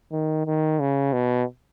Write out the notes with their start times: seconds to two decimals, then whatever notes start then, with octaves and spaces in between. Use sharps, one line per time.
0.12 D#3
0.46 D#3
0.80 C#3
1.13 B2